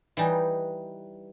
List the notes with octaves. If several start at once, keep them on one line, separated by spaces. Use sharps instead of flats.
E3 G3 D#4